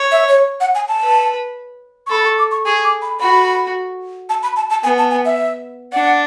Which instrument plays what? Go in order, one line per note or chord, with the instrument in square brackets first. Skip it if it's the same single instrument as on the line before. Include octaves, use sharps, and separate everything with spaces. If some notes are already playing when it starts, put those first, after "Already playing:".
Already playing: [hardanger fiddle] C#5
[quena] E5
C#5
F#5
G#5
A5
[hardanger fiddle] B4
[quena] C#6
[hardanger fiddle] A4 [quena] B5
[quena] C#6
D6
C#6
[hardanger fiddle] G#4 [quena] C#6
[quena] D6
B5
[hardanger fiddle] F#4 [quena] B5
[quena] A5
B5
A5
A5
[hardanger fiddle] B3 [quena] G#5
[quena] A5
G#5
E5
[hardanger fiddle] D4 [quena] F#5